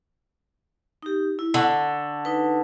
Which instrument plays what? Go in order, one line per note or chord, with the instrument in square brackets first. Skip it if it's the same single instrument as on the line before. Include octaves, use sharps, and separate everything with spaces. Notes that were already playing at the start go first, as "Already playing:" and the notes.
[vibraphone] D#4 G4
E4
[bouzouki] D3 [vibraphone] C#6
[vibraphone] D#4 B4